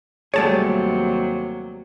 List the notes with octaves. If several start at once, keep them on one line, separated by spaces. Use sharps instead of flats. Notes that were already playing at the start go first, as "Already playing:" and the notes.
D#2 C3 F#3 G3 A3 G#4 C#5 A5